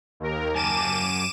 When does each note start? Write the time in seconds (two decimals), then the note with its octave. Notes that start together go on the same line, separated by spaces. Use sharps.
0.20 D#2 A#4
0.55 F#2 G#5 A5 D6 D#7 E7